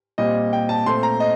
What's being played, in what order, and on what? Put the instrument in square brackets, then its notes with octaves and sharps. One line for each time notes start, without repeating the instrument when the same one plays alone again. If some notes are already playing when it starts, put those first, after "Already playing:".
[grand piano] A#2 G3 C4 D#5
G5
A5
A#2 A3 C4 C6
A#5
D#5